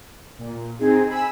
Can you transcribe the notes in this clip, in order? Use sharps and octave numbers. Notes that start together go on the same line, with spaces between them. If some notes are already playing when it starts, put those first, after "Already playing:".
A#2
C4 D#4 G#4
G#5 B5 E6